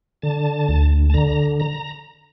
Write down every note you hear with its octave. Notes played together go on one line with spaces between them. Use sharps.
D3 A5
D2
A5
D3 A#5
A#5